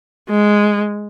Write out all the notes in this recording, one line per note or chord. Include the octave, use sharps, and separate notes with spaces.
G#3